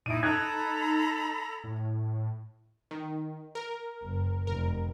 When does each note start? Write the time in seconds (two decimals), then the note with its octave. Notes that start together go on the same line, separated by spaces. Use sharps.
0.06 A#2 D#4 E4 D7 D#7
0.23 D#4 A4 A#5 B5 D#6 F#6 G#6
1.64 A2
2.91 D#3
3.55 A#4
4.03 F#1
4.47 F1 A#4